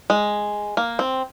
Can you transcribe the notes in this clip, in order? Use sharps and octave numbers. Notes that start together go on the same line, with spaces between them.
G#3
A#3
C4